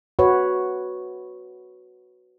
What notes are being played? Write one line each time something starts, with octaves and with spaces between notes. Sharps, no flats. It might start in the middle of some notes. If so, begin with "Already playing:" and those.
F#4 B4 C#5